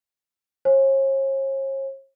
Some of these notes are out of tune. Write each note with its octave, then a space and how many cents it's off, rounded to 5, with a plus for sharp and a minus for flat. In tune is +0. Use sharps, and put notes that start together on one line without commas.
C#5 -45 G#5 +0